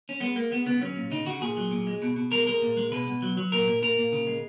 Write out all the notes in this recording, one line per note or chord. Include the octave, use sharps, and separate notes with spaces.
C#4
G#3 B3
G#3 A#3
G#3 B3
C#3 B3
F#3 C#4
A#2
C#3 D#4
C#3 F#4
A#2 G#4
F#3
A#2
G#3
B2
B2
G#3 A#4
G#3 A#4
A#2
G#3
B2 B4
B2
F#3
F#3
A#2 A#4
A#2
A#2 A#4
A#2
C#3
G#3